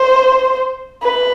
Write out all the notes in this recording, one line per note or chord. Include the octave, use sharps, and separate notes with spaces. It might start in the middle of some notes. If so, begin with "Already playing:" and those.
Already playing: C5
B4